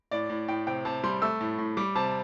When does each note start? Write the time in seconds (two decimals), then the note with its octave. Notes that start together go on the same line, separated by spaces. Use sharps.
0.11 A2 D5
0.30 A2
0.48 A2 G5
0.67 C3 G5
0.85 C3 A5
1.03 G3 C6
1.22 A3 E6
1.41 A2
1.58 A2
1.77 G3 D6
1.95 C3 A5